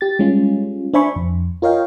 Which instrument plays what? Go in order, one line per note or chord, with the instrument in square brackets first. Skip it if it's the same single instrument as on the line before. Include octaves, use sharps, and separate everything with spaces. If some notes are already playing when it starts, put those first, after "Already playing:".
[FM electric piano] G4 A6
G3 G#3 C#4 F4
D4 C5 E5 G#5 B5 C#6
F2
F4 A#4 C#5 D#5 F5 G5